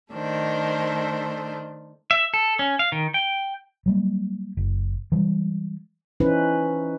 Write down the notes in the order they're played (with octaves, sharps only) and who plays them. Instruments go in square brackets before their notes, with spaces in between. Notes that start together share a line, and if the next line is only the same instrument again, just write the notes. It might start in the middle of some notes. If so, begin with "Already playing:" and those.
[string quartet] D#3 A3 D4 C5
[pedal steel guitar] E5
A4
C#4
F5
D#3
G5
[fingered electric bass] F#3 G3 A#3
F#1
E3 G3 G#3
[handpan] E3 C#4 D#4 E4 B4 C5